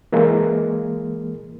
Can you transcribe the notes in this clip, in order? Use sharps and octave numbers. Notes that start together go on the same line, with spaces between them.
E3 G#3 A#3